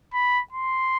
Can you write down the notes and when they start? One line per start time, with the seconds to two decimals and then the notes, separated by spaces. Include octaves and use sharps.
0.14 B5
0.52 C6